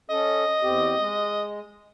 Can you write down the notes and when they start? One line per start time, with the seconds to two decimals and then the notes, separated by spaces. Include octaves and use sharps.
0.10 C#4 A4 D#5
0.62 E2 C4 G4
0.99 G#3